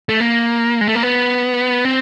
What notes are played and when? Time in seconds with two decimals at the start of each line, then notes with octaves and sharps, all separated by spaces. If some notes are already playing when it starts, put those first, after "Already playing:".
0.09 A3
0.20 A#3
0.81 G#3
0.88 A3
0.95 A#3
1.03 B3
1.85 C4